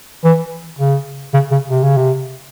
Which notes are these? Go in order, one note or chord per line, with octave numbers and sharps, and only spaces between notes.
E3
C#3
C#3
C#3
C3
C#3
C3